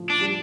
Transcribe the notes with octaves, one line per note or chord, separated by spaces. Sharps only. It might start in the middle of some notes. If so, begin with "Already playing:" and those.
Already playing: A2 F3
D4
G3